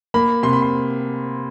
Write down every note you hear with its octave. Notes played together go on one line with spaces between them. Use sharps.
A#3 B5
C3 C6
B5
C6